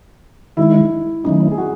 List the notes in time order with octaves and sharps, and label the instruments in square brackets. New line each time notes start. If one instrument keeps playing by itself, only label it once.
[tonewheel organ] D#3 G#3 D#4 [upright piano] E4
[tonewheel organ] D#3 F#3 A3 C#4 E4 [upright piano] D#4
[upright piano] G#4
F#4